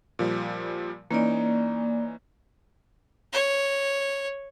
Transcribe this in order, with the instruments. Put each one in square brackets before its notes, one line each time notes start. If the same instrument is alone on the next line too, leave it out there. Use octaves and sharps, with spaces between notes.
[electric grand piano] A#2 F3 G3
[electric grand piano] E3 C#4 D#4 [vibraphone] A#3 D5
[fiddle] C#5